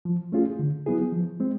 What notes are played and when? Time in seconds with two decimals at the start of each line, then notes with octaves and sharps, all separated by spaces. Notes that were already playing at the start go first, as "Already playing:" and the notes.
0.05 F3
0.32 A3 C#4 F4 G#4
0.59 D3
0.86 F#3 B3 E4 G#4
1.13 F3
1.40 G#3 C4